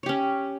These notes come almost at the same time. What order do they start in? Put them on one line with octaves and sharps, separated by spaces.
C#5 G4 C#4